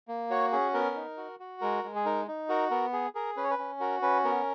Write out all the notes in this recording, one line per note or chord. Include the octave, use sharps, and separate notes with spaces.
A#3
F#4 C#5
C#4 G#4
B3 A#4
D#4
F#4
F#4
G#3 A#4
G#3
G#4
D#4 A#4
D#4
F#4 A#4
B3 A#4
G#4
G#4 A#4
C#4 B4
C#5
B4
C#4
F#4 A#4
C#4 B4
B3 A#4